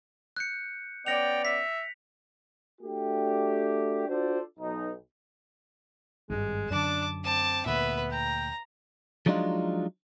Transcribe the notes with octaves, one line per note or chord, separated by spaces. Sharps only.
F#6 G6 C#7
B3 C#4 D5 G5 A#6 C#7 F7
E5 B6
A3 D4 F#4 G4
D4 F4 F#4 A4 C5 D5
B1 D#4
G#1 G2 G#3
F#2 D3 D4 A5 D6
C4 A5 D6
D2 A#2 B3 B4 E5
G5 A#5
F3 F#3 G#3 D4 D#4 F4